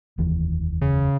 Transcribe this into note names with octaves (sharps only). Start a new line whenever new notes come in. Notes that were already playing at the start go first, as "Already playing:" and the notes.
F1 D#2 E3
C#3